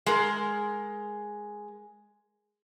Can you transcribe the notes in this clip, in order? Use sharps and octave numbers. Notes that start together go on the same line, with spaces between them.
G#3 A#4